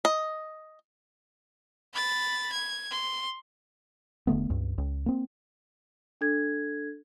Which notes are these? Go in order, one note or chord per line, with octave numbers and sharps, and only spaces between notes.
D#5
B5 A6
G#6
C6
E1 D3 A3 B3
C#2 G2
C#2
A#3 C4
D4 A4 G#6